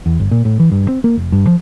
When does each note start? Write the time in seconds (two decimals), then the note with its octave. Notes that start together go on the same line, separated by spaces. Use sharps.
0.06 E2
0.20 G1
0.31 A#2
0.45 A2
0.60 E3
0.72 G2
0.89 C4
1.04 A#3
1.17 F1
1.32 G2
1.47 F3